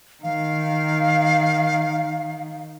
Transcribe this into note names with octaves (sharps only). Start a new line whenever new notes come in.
D#3 F5